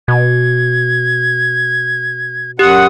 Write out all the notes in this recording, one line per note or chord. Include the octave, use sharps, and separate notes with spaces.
B2 G#6
F#2 G4 F#5 D#6